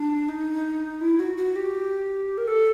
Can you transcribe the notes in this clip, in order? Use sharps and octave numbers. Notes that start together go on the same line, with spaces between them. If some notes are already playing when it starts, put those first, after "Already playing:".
Already playing: D4
D#4
E4
F#4
F#4
G4
A#4
A4